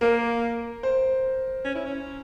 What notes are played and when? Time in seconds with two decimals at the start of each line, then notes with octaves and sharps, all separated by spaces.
0.01 A#3 A#4
0.83 C5
1.64 C#4
1.75 E4
1.86 C#4